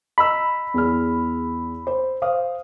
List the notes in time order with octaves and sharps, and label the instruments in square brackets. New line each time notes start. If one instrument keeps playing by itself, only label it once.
[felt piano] D#5 A#5 E6 [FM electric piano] B5
[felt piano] E2 G#4 F6
C5
C5 F5 D#6